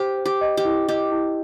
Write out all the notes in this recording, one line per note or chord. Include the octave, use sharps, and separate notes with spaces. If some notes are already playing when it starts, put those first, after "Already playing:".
Already playing: G4 C5
C5
G4
D#5
G4
E4
G4 D#5
E4